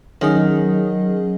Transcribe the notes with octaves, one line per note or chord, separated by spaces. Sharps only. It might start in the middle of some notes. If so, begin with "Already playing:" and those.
D#3 F#3 C#4 G#4 D#5